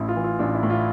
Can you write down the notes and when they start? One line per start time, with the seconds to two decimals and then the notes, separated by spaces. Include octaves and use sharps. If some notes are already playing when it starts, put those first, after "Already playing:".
Already playing: A1 E4
0.09 F4
0.16 E3
0.24 F4
0.39 A1 D4
0.54 E4
0.63 A2
0.70 F4